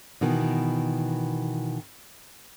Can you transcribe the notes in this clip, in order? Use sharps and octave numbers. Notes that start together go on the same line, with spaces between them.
B2 D#3 E3